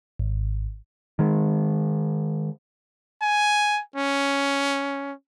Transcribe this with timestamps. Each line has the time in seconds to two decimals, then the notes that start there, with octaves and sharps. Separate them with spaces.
0.19 G#1
1.19 D#3 G#3
3.22 G#5
3.96 C#4